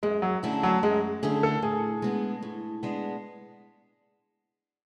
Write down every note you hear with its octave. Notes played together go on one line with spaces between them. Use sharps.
F#2 G#3
F#3
D3 A3 C#4 E4
F#3
F#2 G#3
D3 A3 C#4 E4 G#4
A4
A2 G#4
G#3 B3 D4
A2
G#3 B3 D4